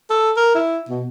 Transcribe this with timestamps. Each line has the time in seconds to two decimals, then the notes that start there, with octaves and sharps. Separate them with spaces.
0.10 A4
0.37 A#4
0.55 E4
0.89 B2